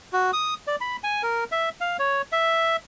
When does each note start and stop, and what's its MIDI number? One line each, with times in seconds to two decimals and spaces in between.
0.13 0.31 66
0.33 0.54 87
0.67 0.76 74
0.81 0.97 83
1.04 1.23 80
1.23 1.44 70
1.52 1.69 76
1.81 1.97 77
1.99 2.22 73
2.32 2.76 76